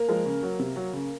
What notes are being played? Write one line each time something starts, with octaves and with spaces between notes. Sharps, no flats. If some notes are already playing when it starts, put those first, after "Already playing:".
Already playing: A#3 A#4
F3 G#3
C#3
F#3
C3
F#3
C#3